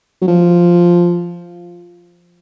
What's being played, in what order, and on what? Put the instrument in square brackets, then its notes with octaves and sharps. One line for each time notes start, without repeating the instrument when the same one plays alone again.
[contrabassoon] F#3
F3